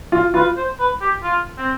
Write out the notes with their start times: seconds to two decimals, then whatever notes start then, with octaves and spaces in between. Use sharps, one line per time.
0.12 F4
0.34 F4 B4
0.57 C5
0.79 B4
1.01 G4
1.23 F4
1.57 C4